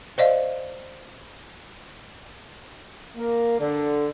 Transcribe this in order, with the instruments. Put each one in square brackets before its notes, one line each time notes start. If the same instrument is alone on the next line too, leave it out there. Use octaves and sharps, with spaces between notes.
[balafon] C5 D5 D#5 F5
[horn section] A#3
D3